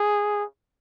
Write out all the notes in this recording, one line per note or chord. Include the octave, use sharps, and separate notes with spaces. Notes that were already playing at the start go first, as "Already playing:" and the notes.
Already playing: G#4